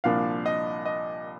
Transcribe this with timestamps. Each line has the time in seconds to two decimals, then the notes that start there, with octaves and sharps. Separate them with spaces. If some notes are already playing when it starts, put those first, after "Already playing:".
0.04 C2 A#2 F3 A#3 D4 F5
0.46 D#5
0.85 D#5